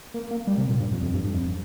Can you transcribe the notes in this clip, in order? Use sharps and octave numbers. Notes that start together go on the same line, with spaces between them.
A#3
A#3
G3
C3
A#2
G2
F2
F2
G2
G2
F2